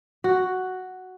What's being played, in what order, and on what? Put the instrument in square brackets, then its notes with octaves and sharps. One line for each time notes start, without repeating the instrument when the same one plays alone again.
[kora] F#4